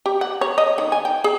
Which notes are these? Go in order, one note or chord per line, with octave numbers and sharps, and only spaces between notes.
G4
F#5
C#5
D#5
D#3
G#5
G5
G#4